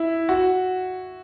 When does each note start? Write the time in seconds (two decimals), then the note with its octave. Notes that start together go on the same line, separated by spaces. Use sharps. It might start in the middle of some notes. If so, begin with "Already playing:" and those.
Already playing: E4
0.29 F#4